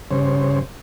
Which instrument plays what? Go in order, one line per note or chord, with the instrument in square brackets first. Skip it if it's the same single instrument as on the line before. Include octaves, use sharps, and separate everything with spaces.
[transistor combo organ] G2 C#3 C5 C#5